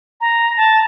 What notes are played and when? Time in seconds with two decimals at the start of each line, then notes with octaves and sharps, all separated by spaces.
0.21 A#5
0.57 A5